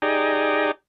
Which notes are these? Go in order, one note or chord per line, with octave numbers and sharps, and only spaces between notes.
D#4 G4 G#4 D5 A#5